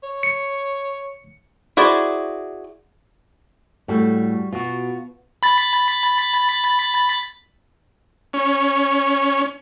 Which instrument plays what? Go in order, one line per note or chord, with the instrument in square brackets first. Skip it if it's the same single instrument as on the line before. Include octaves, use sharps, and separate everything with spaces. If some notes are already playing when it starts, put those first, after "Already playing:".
[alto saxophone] C#5
[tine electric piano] C#7
[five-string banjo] E4 F#4 G#4 C5 D5
[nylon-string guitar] A2 A4 [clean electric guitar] G3 F#4
[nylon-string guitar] B2 [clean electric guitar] F4 F#4
[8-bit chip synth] B5 A6
[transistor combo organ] C#4